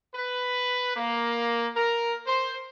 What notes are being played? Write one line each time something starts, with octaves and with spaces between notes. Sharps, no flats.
B4
A#3
A#4
C5